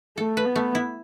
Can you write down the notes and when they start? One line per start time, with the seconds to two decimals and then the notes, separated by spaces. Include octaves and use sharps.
0.18 A3 A4
0.37 B4
0.46 B3
0.56 A3
0.75 E4